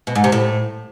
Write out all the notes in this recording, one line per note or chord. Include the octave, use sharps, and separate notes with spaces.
B2
G#2
C3
A2